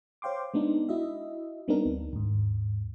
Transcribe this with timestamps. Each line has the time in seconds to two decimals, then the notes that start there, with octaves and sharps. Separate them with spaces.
0.22 C5 C#5 F5 G5 C6 D6
0.54 G#3 B3 D4 D#4
0.89 E4 F#4 D#5 E5
1.68 G3 B3 C4 D4 D#4 A#4
1.85 D2
2.13 D#2 G#2